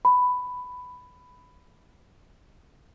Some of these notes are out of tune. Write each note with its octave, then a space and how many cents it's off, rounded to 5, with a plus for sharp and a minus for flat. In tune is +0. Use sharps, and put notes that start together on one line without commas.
B5 +10